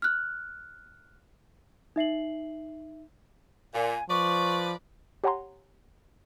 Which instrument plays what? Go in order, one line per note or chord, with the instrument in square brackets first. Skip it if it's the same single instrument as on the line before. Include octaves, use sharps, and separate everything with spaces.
[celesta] F6 F#6
D#4 E5 C7 F#7
[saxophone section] A#2 [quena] G#5
[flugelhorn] F3 [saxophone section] B4 D5 [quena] C#6
[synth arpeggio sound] G4 C#5 F#5 G#5 A#5 C6